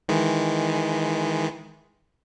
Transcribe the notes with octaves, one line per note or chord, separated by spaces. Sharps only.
D#3 E3 G#3